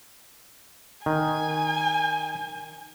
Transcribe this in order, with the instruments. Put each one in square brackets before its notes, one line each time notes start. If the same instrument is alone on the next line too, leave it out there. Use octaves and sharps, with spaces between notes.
[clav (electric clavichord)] D#3 [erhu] G#5